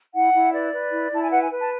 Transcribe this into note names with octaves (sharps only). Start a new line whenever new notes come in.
E4 F#5
E4
B4 D5
B4
E4
E4 A5
G#5
B4 F#5
G#5
B4
A5